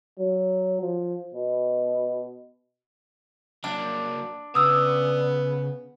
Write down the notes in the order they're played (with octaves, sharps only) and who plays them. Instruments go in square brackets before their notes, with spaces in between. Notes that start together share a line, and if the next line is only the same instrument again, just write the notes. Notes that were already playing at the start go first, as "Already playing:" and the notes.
[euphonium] F#3
F3
B2
[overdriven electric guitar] F#3 A#3 [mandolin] D4
[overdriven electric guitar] C#3 [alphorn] B3 [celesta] D#6 E6